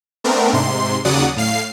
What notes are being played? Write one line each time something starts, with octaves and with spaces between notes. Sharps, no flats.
A3 B3 C4 D4 A#4
G#2 C3 C6
D#2 C#3 F#3 D5 F#5 D#6
A2 F5 C7